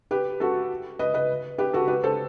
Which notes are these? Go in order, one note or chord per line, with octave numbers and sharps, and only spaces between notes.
G4 B4
F#4 A4
B4 D#5
B4 D#5
G4 B4
F#4 A4
G4 B4
A4 C5